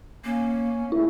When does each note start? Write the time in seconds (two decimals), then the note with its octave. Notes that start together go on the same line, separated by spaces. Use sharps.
0.25 A#3 C#4
0.92 A#2 C#3 A3 E4